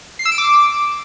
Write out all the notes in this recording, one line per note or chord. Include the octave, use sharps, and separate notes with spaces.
C7
E6
D7
D6